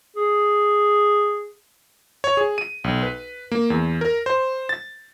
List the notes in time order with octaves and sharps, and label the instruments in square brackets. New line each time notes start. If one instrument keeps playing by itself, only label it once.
[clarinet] G#4
[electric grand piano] C#5
G#4
D#7
B1
B4
A#3
E2
A#4
C5
A6